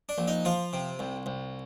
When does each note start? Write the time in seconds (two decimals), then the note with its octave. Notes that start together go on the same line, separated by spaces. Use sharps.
0.09 D4
0.18 A#1
0.28 D#4
0.45 F3 F4
0.73 C3
0.99 C2
1.26 C2